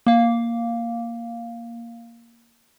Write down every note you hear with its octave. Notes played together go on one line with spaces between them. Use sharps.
A#3 F5